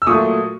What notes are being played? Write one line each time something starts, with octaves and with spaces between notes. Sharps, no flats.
E6
A#2 F#3 A3 C#6 D#6